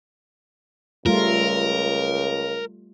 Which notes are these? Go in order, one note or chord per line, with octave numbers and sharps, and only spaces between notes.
C#2 G3 A3 F4 A#4